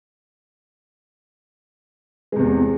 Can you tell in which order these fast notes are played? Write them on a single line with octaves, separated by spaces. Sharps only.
G#3 C3 E2